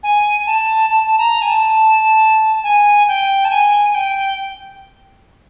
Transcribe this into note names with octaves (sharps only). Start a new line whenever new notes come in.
G#5
A5
A5
A#5
G#5
A5
G#5
G5
A5
G#5
G#5
G5